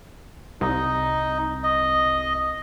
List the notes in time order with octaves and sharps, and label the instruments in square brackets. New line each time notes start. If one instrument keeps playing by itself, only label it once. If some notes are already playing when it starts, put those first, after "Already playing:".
[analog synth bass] C2 [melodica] D#4 D#5
[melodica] D#5